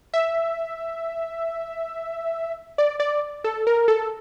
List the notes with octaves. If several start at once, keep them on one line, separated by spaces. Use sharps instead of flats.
E5
D5
D5
A4
A#4
A4